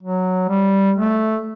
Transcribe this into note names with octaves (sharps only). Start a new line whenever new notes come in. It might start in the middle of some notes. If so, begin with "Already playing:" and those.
F#3
G3
A3